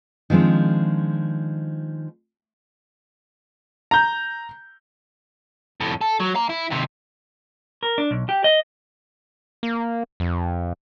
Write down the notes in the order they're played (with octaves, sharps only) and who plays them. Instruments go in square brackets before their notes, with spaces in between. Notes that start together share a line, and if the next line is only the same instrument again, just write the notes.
[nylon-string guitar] D#3 F3 G#3 C4 D4
[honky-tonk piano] A#5 G6
[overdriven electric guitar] F2 A2
A4
F#3
F5 A#5
E4
D#2 C3
[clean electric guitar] A#4
D4
B1
G4
D#5
[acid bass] A#3
F2